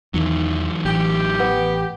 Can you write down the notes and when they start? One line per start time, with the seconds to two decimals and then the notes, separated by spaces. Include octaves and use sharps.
0.14 E2 D#3 E3 F#3
0.85 A1 G4
1.40 B3